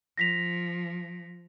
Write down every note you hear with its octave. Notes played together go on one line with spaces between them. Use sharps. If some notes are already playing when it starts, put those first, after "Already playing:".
F3 A#6 B6 F7